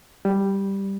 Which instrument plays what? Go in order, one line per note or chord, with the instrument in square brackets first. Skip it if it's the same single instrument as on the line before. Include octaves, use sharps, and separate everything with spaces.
[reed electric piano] G3